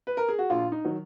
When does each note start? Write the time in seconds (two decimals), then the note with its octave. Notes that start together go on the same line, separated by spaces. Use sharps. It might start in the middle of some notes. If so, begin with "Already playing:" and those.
0.07 B4
0.17 A#4
0.29 G#4
0.39 F#4
0.50 A#1 F4
0.72 D#4
0.85 D#3 F#3